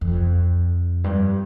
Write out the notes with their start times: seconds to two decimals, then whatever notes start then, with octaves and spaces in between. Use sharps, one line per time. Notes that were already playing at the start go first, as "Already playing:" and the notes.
0.01 F2
1.04 G2